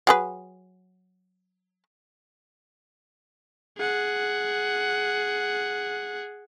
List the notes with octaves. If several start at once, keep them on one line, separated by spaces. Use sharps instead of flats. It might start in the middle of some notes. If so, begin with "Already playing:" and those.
F#3 G#4 B4
G#4 F#5